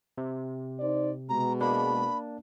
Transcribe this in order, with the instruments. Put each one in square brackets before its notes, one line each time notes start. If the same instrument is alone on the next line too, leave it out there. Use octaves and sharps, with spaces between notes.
[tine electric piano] C3
[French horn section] D#4 C5 D5
[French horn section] B2 G#3 [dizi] A#5
[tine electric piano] A#3 D4 [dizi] B5